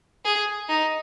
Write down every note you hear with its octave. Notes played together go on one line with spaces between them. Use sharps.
G#4
D#4